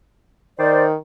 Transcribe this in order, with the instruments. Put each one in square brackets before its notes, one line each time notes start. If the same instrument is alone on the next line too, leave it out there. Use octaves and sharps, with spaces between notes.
[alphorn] D#3 [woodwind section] C5 D5